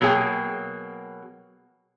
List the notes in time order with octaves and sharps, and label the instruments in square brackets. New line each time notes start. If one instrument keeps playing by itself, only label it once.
[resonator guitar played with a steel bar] B2 F#3 A#3 G#4 G5